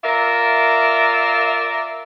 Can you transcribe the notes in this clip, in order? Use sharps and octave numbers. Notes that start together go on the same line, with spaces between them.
F4 A#4 D5 E5